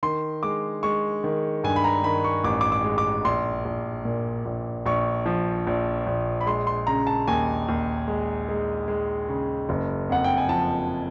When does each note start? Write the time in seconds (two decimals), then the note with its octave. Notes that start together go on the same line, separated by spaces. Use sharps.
0.03 D#3 C6
0.43 G#3 D6
0.83 G#3 C#6
1.24 D#3
1.64 G2 G#5
1.76 B5
1.84 A#5
2.04 D#3 B5
2.24 C#6
2.44 A1 D6
2.61 D6
2.72 D6
2.84 G#3
2.98 D6
3.25 A#1 C6
3.65 A#1
4.05 A#2
4.45 A#1
4.86 A#1 C#6
5.26 F3
5.67 A#1
6.06 A#1
6.41 B5
6.46 G#3 C6
6.67 C6
6.87 C#3 A#5
7.07 A5
7.27 D#2 G#5
7.68 D#2
8.08 G#3
8.48 G#3
8.88 G#3
9.28 C#3
9.69 F#1
10.10 F2 F#5
10.24 G5
10.37 G#5
10.49 F3 A5